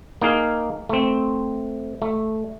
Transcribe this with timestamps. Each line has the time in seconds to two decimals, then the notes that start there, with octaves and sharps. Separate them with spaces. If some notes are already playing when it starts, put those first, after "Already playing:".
0.22 A#3 D#4 G#4 F5
0.89 A3 C4
2.02 A3